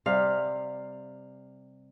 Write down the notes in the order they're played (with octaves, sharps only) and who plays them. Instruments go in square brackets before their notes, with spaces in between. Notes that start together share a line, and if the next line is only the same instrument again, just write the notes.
[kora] C3 G3 F5